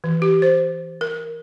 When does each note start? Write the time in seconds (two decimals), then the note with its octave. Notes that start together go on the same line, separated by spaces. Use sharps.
0.04 E3
0.22 G4
0.42 C5
1.01 A#4